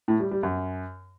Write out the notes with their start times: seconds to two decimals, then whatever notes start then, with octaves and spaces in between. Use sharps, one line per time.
0.08 A2
0.20 G3
0.31 G3
0.43 F#2